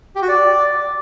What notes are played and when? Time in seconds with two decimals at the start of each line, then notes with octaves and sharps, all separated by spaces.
0.16 G4
0.22 F#4
0.29 D5